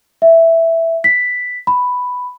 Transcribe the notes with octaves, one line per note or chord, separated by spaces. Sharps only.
E5
B6
B5